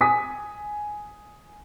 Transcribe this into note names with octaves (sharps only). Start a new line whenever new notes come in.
G#5 D#6 B6